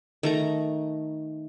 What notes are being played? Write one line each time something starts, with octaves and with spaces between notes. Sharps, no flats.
D#3 A3 A#5